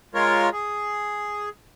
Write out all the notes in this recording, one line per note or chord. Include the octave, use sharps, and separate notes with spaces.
G#3 F4 A#4 C#5
G#4